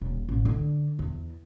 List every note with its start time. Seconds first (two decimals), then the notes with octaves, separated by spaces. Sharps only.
0.01 D#1
0.29 A1
0.45 D3
0.99 E2